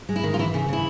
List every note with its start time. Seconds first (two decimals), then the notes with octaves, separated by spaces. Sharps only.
0.09 G#3
0.16 E4
0.23 D#3
0.34 F4
0.39 E3 E4
0.54 C#3
0.69 C#3 E4